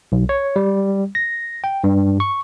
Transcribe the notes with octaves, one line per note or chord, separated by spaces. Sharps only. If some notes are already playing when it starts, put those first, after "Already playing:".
B1
C#5
G3
A#6
G5
G2
C#6